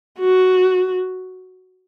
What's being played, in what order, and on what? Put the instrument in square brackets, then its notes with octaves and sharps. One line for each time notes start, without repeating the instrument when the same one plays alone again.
[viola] F#4